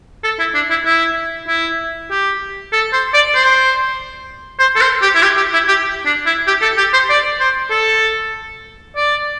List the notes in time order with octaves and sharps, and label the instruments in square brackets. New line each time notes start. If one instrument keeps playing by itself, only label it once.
[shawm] A4
E4
D4
E4
E4
E4
G4
A4
C5
D5
C5
C5
A4
C5
G4
E4
G4
G4
E4
G4
D4
E4
G4
A4
G4
C5
D5
C5
A4
D5